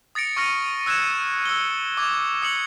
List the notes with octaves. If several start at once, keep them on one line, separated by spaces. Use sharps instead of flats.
D#6 A6 A#6 C#7 D7
C#6 D#6 F6 A#6 C#7 D#7
E6 F#6 G#6 C#7 E7
E6 G7
D6 D#6 G#6
D#6 C#7 F#7